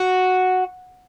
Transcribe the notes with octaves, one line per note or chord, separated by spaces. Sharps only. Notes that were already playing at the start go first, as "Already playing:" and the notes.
Already playing: F#4